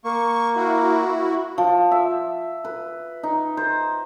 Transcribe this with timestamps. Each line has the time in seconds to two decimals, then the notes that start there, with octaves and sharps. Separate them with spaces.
0.04 A#3 C#6
0.56 E4 F#4
1.58 F3
1.91 E5
2.65 B4
3.23 D#4
3.57 C5